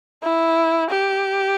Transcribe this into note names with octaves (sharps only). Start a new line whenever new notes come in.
E4
G4